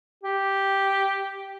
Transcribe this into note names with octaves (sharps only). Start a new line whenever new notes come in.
G4